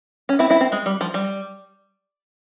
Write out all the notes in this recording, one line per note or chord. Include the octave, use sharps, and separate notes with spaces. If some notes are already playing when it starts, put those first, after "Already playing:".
C#4
C4 E4
C4 E4
C4
G#3
G3
F3
G3